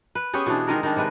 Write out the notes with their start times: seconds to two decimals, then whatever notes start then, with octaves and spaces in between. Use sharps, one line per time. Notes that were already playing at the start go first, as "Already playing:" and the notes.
0.15 B4
0.34 B3 C#4 G4 G#4
0.46 B2 E3 D4
0.67 D#3 G#3 A#4
0.83 D#3 G3 D4
0.96 C3 G3 G#3 B4